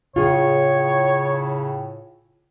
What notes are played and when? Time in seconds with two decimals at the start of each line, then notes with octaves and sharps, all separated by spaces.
0.16 A2 C#3 F4 G#4 C#5